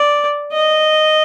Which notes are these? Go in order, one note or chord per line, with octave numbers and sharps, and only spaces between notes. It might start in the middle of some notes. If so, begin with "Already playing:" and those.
Already playing: D5
D#5